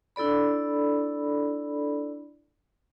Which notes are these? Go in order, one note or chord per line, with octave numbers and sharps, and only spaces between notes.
D4 E4 A4 D5 B5